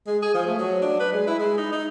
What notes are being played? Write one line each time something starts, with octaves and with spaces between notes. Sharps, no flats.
G#3
G#4
F3
A3
F#3
D4
B4
G#3
E4
G#3
D#4
D#4